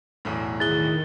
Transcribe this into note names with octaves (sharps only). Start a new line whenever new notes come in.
B1 E2 A2
D#3 E4 G#4 F#6 A6 G7